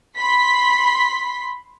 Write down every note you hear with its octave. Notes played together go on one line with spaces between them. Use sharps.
B5 C6 B6